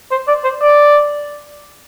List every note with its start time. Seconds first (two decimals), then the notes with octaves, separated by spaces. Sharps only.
0.11 C5
0.28 D5
0.44 C5
0.61 D5